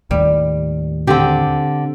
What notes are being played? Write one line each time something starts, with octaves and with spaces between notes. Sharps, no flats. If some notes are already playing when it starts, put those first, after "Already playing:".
D#2 A2 G3
D3 C4 G4